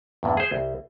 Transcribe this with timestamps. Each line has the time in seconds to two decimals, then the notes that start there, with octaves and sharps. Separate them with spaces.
0.23 E2 G2 A#2
0.37 G#4 C5
0.52 C2